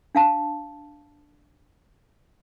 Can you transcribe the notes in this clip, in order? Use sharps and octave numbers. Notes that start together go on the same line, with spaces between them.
D4 F5 A5